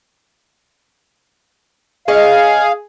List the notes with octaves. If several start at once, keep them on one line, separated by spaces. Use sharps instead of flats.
C#4 G#4 D#5 F5